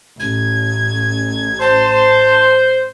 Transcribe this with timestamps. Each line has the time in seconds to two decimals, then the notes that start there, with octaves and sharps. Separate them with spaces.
0.20 A1 G#6
1.60 C5 A5